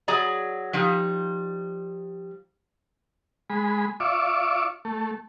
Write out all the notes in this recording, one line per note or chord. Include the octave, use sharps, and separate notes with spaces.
F#3 G#4 D5 A#5
F3 G3 D#4
G#3 B5
F4 D5 E5 C#6 D6
A3